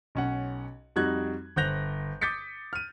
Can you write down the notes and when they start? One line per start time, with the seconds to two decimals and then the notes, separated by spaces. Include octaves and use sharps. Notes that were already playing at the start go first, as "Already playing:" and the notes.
0.15 B1 C#4 F#5
0.96 F2 G3 D#4 F#4 F#6 G#6
1.56 G1 C5 F#6 G6 A#6 F7
2.21 D6 D#6 G6 A6 B6 C#7
2.73 F6 D#7